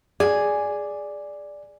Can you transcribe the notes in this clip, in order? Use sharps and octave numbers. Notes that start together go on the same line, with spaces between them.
G#4 D5 G#5